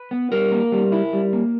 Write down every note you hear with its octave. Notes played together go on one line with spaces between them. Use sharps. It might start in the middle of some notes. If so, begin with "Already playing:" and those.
Already playing: B4
B3
G3 A#4
A#3
G3
E4
G3
A#3